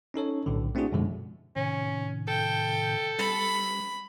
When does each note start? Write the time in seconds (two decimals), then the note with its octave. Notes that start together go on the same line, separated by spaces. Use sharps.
0.14 C#4 D#4 A4 C#5
0.46 B1 A2 D3
0.75 A3 C4 D4 E4 F#4 G#4
0.92 F#2 B2 D3 F3 G#3
1.56 A2 C3 D#3 C#4
2.28 A4 G5
3.19 G3 B5